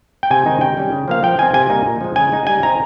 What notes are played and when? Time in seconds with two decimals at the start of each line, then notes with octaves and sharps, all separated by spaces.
0.23 G5
0.31 C3 G#5
0.46 D#3 G#3 C4 D#4
0.61 C3 G5
0.77 G3 C#4
0.92 C#3
1.08 F3 A#3 F5
1.23 F3 G5
1.39 C4 D#4 G#5
1.54 C3 G#5
1.70 G3 A#3 D#4
1.85 A#2
2.01 F3 G#3
2.16 C#3 G#5
2.32 G#3 D#4
2.47 G3 G#5
2.62 C4 D#4 A#5